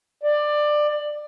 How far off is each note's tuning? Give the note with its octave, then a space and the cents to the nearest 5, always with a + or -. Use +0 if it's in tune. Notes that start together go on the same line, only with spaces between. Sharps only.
D5 +20